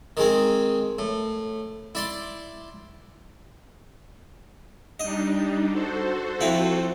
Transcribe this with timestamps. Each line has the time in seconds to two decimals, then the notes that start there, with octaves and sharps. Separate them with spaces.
0.17 D#3 G#3 C4
0.98 A2
1.95 E4 D5 C6
5.00 G3 D4 D#4 D#5
5.70 F#4 A4 C5
6.41 F3 C4 E4